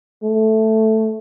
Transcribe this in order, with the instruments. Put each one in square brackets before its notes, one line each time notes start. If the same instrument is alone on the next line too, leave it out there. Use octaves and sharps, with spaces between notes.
[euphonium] A3